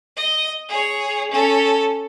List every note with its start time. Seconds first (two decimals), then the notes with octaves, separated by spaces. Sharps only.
0.17 D#5
0.69 G#4 C#5
1.31 C#4 A4